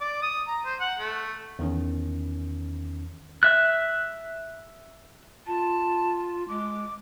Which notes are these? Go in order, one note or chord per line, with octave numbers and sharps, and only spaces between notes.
D5
D#6
A#5
C5
F#5
A3
E2 D#3 C#4
E5 F#6
F4 A5
G#3 D6